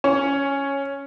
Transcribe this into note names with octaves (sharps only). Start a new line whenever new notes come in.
C#4